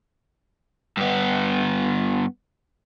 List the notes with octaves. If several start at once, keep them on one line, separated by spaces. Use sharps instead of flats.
G2 B3